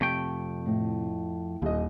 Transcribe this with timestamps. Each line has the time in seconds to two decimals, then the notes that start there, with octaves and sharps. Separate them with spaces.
0.01 F2 C3 A3 G5
0.66 A2
1.62 D#1 D#2 D#5